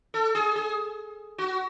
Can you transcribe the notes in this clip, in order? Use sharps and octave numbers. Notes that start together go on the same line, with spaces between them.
A4
G#4
G#4
F#4